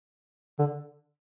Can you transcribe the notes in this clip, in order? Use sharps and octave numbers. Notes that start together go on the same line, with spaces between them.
D3